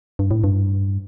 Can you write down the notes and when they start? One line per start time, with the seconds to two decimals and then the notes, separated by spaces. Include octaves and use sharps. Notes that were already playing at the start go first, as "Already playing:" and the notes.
0.19 G2
0.31 A2
0.44 G2